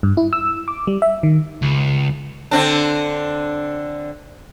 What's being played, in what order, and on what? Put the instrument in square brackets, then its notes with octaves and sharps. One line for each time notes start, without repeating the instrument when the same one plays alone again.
[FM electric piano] G2
E4
E6
D6
G3
E5
D#3
[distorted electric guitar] C#2
[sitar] D3 C4 D4